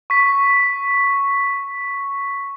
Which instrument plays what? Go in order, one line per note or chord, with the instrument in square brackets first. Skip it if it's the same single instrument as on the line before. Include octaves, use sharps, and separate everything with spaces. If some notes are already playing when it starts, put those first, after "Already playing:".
[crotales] C#6 B6